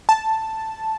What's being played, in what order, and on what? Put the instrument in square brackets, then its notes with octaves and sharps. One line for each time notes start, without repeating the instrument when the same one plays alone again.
[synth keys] A5